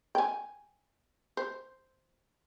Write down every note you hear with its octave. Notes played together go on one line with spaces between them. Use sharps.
G5 G#5
C5